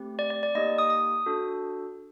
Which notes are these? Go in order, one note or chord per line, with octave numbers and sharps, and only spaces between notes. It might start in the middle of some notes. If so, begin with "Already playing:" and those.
Already playing: A3 C4 G4
D5
D5
D5
A#3 D#4 G4 D#5
D#6
D#6
D4 F#4 A4